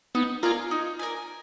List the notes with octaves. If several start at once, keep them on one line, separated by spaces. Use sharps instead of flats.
B3 D#4
F4 A#4 D5 G#5
D#4
A#4 D5 G#5